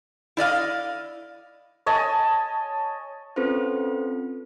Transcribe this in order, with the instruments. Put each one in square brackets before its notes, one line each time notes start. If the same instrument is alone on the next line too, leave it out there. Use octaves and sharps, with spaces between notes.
[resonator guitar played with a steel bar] E4 D5 D#5 F5
[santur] C#5 D#5 G#5 A5
[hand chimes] C4 C#4 F4 A4 B4 C5